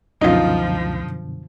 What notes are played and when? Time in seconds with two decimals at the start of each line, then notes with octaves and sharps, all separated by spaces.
0.21 C#2 F#2 B2 D3 F3 D#4 F4